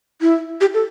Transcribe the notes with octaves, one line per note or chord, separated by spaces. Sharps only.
E4
G4
A4